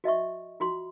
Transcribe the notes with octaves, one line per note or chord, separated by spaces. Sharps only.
F#4 D#5 E5 C#6
F4 F#4 C6